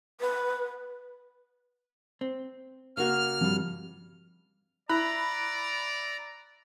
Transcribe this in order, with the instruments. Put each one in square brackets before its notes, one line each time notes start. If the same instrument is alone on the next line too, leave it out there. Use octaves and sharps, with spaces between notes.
[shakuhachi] B4
[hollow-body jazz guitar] C4
[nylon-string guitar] C#3 A#3 F#4 [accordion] F6
[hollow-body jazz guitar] G2 G3 [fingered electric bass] F3 C4
[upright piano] E4 [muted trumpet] D5 [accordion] A#5 [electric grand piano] B5 F#6